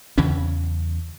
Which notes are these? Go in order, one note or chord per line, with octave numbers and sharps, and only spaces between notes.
E2 C#3 E3 C#4